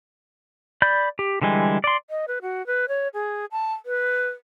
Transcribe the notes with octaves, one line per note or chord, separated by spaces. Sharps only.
D5 B5 G6
G4
D3 E3 G3 G#3
D5 C6
D#5
B4
F#4
B4
C#5
G#4
A5
B4